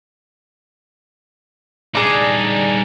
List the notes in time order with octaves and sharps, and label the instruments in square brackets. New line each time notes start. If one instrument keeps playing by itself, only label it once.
[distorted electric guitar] G3 D#4 [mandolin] D4 G#4